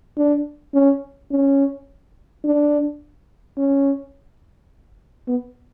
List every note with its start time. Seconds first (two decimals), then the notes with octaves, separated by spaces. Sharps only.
0.17 D4
0.74 C#4
1.31 C#4
2.45 D4
3.58 C#4
5.28 B3